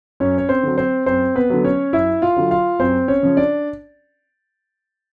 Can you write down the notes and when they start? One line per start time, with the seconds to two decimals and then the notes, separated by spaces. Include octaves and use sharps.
0.20 F#2 C#4 C#5
0.38 C#5
0.49 C4 C5
0.63 D3 F#3
0.78 C4 C5
1.06 F#2 C4 C5
1.35 B3 B4
1.50 D3 F#3
1.65 C#4 C#5
1.93 F#2 E4 E5
2.22 F4 F5
2.37 D3 F#3
2.51 F4 F5
2.79 F#2 C4 C5
3.08 C#4 C#5
3.23 C#3 F3
3.37 D4 D5